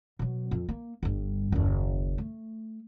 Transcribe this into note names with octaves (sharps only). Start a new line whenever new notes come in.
B2 F#3
F2
A#3
G1 G2
F#1 D#2
A3